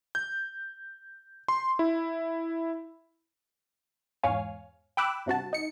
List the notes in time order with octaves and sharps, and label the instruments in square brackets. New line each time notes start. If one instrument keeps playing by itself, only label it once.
[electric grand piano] G6
C6
E4
[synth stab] E2 G#2 C#5 F5 G#5
G5 B5 D6 E6 F#6
G2 C3 F#4 A5
D#4 C#7